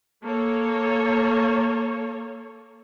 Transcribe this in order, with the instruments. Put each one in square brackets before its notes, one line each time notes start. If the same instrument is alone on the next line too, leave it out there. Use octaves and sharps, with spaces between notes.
[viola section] A#3 A4 C#5